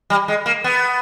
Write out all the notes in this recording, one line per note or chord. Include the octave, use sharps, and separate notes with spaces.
G3
G#3
A#3
B3